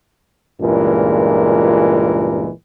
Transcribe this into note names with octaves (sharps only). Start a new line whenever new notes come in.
C#2 G2 A#2 E3 G#3 A#4